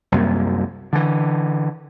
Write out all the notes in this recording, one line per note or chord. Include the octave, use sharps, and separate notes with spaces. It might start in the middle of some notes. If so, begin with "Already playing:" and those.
C2 F#2 A#3
D3 E3